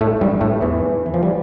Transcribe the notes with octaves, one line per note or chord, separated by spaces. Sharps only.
A2 A3
G2 G3
A2 A3
E2 E3
E3
F3
G3